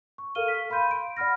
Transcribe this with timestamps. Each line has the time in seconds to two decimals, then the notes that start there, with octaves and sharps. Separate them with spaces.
0.18 C#6
0.35 A4 A#4 F5 F6 D#7 G7
0.48 B6
0.70 F5 B5 C6 G6 D#7
0.91 D7
1.17 D5 F#5 B5 F6 A#6